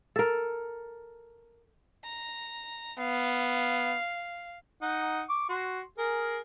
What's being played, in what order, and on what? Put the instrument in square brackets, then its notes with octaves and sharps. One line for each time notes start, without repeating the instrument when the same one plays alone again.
[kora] A4 A#4
[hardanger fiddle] A#5
[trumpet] B3 [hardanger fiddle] F5
[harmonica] D#4 F#5
C#6 D6
F#4 C6
G#4 A#4